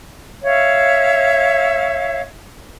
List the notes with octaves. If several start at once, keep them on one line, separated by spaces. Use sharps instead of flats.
C#5 E5 F5